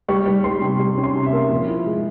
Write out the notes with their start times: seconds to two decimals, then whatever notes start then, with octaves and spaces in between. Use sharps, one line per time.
0.08 G3 C#6
0.26 G3
0.44 G3 C6
0.62 C3
0.80 G3
0.98 C#4
1.03 C6
1.15 C3
1.26 E5
1.33 A#3
1.50 F3
1.68 E4
1.86 G#3